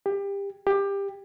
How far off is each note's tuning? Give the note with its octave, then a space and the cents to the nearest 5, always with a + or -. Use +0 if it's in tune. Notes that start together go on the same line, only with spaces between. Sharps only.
G4 +25
G4 +20